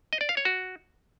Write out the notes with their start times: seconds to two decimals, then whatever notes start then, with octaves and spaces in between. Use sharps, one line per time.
0.13 D#5
0.21 D5
0.29 F5
0.37 C#5
0.45 F#4